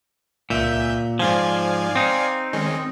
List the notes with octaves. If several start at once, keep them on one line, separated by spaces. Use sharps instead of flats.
C#2 A#2 E5 G6
G#2 F3 D5 F5 G#5
C4 D#4
D#3 G#3 C#4